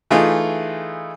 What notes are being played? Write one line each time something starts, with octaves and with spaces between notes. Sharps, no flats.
E3 A3 D#4 F4 G#4